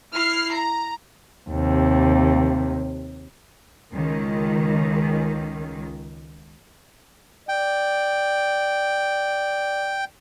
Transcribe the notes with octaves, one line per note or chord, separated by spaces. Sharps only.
E4 F6 C7
A#5
D#2 C3
C#2 D#3
D5 G5